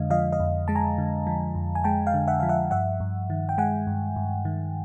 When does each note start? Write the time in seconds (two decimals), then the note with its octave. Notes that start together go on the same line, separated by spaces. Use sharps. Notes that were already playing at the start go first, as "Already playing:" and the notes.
Already playing: F2 D3 G#3 D#5 F5
0.10 F3 D#5 F5
0.32 D#5 F5
0.40 F2
0.68 G#3 A5
0.75 G#5 A#5
0.98 D3
1.27 F3
1.55 F2
1.75 G#5
1.84 G#3 G5 A5
2.07 F5 G5
2.14 D3
2.28 E5 F#5
2.40 F3 F5
2.49 E5 F#5
2.71 G2 E5 F#5
3.00 G2
3.30 D#3
3.49 G5
3.58 G#3 F#5 G#5
3.87 G2
4.16 G2
4.45 D#3